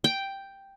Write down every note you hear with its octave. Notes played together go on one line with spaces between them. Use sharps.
G5